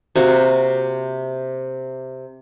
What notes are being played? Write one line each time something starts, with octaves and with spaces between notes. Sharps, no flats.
C3 A#3 F#4 F5